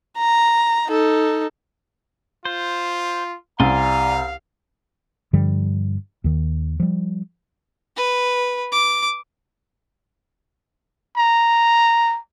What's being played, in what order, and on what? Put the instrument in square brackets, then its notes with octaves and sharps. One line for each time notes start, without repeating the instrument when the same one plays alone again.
[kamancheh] A#5
D#4 A4
[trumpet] F4 [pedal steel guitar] C5
[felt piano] C2 [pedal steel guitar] D5 G#5 C6 [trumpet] F5 [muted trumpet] A#5
[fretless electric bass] G2 D3 F3 G3
D#2 D#3
F3 G3
[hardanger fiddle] B4
D6
[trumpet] A#5